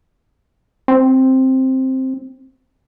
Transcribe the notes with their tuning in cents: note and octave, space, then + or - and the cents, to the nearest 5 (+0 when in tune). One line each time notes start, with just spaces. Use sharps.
C4 +5